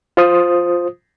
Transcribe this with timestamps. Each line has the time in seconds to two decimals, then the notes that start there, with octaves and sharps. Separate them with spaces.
0.17 F4 C5 D#6